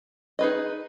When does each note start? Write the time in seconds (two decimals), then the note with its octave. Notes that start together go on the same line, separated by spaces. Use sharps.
0.39 D#4 G#4 B4 D#5